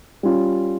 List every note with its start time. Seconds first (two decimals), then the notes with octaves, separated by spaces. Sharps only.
0.23 G3 C#4 F4